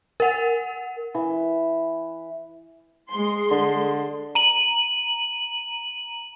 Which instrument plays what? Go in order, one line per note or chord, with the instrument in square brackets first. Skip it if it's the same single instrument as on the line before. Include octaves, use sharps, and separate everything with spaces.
[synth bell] A#4 F#5
[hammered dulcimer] E3
[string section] G#3 C6
[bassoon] D3
[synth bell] A#5 D#7 F#7